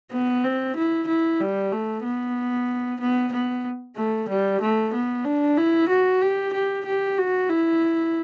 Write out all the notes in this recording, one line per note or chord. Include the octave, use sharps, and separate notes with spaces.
B3
C4
E4
E4
G3
A3
B3
B3
B3
A3
G3
A3
B3
D4
E4
F#4
G4
G4
G4
F#4
E4